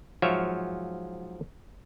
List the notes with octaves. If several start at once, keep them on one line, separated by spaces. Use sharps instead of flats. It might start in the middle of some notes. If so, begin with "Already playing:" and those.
G#2 F3 F#3 C#5 E5 F5